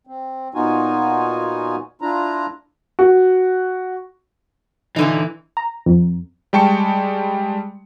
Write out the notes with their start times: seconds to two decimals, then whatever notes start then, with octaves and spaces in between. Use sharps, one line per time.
0.07 C4
0.54 A#2 B3 D#4 F4 F#4 G#5
2.01 D4 E4 F4 A#5
2.99 F#4
4.96 A#2 D3 E3 D#4
5.57 A#5
5.86 F2
6.53 G3 G#3 G5 A5 C#6 C#7